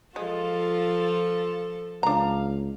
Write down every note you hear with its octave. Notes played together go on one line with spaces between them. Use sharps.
F3 G#3 F4 A4
C#2 D4 F5 A#5